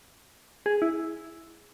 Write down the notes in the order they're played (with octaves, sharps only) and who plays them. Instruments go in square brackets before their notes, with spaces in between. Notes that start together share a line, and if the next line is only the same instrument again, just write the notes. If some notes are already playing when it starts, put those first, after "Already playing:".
[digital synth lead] G#4
E4